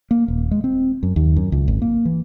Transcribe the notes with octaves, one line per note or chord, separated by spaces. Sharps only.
A#3
D#1
G#3
C4
F#2
D#2
F#2
C#2
G#1
A#3
E3